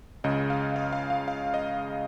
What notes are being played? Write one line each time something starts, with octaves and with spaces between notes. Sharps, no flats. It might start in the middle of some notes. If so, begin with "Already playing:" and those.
C#2 C#3 D#5
F5
F5
F5
F5
F5
D#5